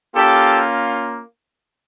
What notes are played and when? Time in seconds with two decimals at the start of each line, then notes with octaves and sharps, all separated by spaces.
0.14 A#3 C#4 F4 G4 A4